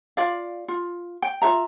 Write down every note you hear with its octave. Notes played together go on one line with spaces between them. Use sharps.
F4 D5 F5
F4
G5
F4 C5 E5 A#5